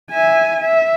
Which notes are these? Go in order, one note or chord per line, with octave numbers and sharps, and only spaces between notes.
E5 G#5
E5